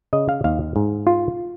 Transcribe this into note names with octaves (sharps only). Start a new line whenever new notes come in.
C#3 D#5
F5
D#2 F5
G#2
F4